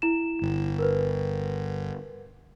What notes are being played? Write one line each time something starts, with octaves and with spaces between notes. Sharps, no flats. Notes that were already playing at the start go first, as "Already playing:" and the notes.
E4 E7
G1
A#4 B4